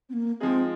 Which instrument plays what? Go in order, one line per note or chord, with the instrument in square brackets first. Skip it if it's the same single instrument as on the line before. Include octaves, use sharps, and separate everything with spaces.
[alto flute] C4
A#3
[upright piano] F3 G#3 D#4 G#4 [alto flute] C4